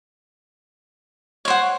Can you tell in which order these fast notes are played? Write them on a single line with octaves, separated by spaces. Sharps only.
C#5 C5 F#5